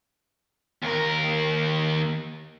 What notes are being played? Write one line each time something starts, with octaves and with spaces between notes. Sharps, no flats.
D#2 A#4